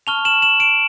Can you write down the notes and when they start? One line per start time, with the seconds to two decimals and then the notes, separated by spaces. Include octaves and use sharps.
0.07 A5 C#6 F6 F7 G7
0.25 E7 F#7
0.42 E7 F#7
0.60 D7 E7